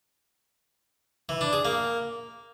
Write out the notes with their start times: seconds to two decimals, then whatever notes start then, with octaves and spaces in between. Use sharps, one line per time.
1.29 E3
1.41 D4
1.53 G#4
1.65 A#3